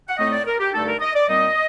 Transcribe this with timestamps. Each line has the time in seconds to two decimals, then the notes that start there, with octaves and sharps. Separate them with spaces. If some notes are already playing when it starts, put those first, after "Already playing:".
0.09 F#5
0.18 A2 A3 C4 D#4 D#5
0.32 D5
0.46 A#4
0.60 G4
0.73 G2 D3 A3 D#4 A4
0.87 A#4
1.00 D#5
1.15 D5
1.28 A#2 G3 C4 D#4 D#5